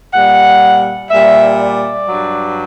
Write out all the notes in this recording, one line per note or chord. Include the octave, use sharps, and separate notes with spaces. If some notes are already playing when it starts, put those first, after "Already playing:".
A#2 G3 F#5
A#2 G3 E5
D5
G2 F#3